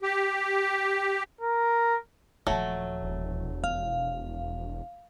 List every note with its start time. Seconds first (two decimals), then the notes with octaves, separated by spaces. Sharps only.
0.02 G4
1.41 A#4
2.47 D#1 F3 F#3 A3
3.02 E1
3.64 F2 F5